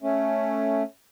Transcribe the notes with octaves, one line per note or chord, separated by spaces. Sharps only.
A3 C#4